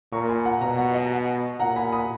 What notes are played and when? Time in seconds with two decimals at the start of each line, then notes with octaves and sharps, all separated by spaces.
0.13 A#2 A#5 C#6
0.29 G#5 B5
0.45 F#5 A#5
0.61 B2 F#5 A#5
0.78 F#5 A#5
0.94 D#5 F#5
1.60 A#2 F#5 A#5
1.76 G#5 B5
1.92 B5 D#6